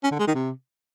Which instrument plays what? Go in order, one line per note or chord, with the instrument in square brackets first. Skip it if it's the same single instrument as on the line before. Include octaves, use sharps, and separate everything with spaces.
[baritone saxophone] C#4
D3
G#3
D#3
C3